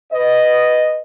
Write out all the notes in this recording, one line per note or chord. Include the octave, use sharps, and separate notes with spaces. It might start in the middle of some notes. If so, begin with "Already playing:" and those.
B4 D#5